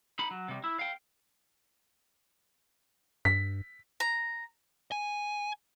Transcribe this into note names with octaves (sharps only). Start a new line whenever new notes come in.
D#4 B5
F#3
C3 G3
E4
F5 G5
G2 B6
A#5
G#5